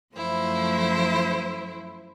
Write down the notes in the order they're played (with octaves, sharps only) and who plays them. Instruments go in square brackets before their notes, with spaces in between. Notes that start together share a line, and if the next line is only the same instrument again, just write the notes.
[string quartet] F#2 F3 A3 E4 C5